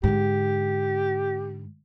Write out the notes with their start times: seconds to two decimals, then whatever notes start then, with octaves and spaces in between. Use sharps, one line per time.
0.03 G#2 D3 G4